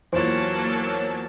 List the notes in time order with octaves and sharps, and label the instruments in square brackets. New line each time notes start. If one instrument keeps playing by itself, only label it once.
[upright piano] E2 F4 [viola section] F#3 A#3 A5 [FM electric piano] C5 C#5